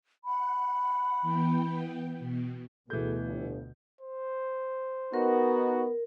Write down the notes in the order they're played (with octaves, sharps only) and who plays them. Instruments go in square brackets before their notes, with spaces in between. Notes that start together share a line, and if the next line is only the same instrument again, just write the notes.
[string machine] F#5 [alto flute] B5
[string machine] E3 B3 G5
B2
[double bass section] D2 B2 [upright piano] E3 G6 [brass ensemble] F#4 G#4 A4
[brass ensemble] G1
[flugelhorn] C5
[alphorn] B3 [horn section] D#4 F#4 [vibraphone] A#4